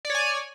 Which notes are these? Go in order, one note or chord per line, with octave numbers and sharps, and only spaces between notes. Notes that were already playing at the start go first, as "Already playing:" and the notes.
C#5 D5 G#5